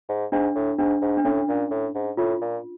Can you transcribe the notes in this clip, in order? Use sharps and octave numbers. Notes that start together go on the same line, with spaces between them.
G#2
G#2 D4
A2
G#2 D4
G#2
D4
A2 C#4
A#2
A2
G#2
A2 F4
A#2